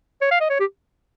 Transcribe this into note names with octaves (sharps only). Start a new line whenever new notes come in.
C#5
F5
D#5
C#5
G4